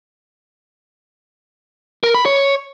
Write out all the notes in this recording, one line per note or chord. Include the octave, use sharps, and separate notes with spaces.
A#4
B5
C#5